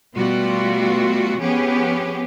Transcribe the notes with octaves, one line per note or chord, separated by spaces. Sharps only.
B2 G3 A3 F4 F#4
F3 B3 C#4 G4 G#4